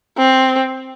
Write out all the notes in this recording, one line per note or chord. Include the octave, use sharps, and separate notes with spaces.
C4